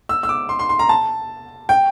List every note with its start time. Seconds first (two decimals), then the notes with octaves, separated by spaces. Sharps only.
0.09 E6
0.23 E6
0.29 D6
0.49 C6
0.59 C6
0.69 C6
0.79 A#5
0.89 A5
1.69 G5